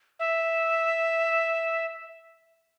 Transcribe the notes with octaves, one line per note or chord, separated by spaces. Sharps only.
E5